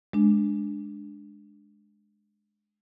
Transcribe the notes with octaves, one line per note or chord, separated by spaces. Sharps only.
G#3 D4